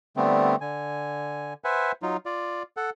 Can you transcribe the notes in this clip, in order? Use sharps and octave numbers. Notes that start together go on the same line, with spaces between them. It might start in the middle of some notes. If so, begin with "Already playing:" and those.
D3 G3 A3 B3 C4
D3 G#5
B4 C5 E5 F#5 G#5
F#3 D#4 F4
F4 D5
A4 F#5